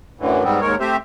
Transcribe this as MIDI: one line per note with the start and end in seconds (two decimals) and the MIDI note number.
0.20 0.43 42
0.20 0.43 45
0.20 0.43 50
0.20 0.43 52
0.44 0.61 44
0.44 0.61 55
0.44 0.61 59
0.44 0.61 60
0.61 0.75 39
0.61 0.75 44
0.61 0.75 56
0.61 0.75 70
0.61 0.75 73
0.80 0.97 57
0.80 0.97 60
0.80 0.97 67
0.80 0.97 72
0.80 0.97 76